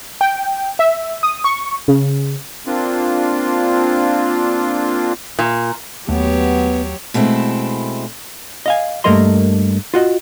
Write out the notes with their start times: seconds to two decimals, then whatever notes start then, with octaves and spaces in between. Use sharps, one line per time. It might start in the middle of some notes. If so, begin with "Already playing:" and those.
0.21 G5
0.79 E5
1.23 D#6
1.44 C#6
1.88 C#3
2.66 A#3 C4 D4 F4
5.39 A#2
6.08 D#2 F#3 A3 B3 G4 C#5
7.14 B2 G#3 A3 C4 E4
8.66 D#5 F5 G#5
9.04 G2 A3 A#3 A#4 D#5 C6
9.94 F4 F#4 D#5